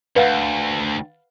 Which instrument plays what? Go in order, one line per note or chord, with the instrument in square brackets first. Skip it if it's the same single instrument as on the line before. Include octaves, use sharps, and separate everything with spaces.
[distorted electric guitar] D2 G2 [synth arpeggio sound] B4 F5 F#5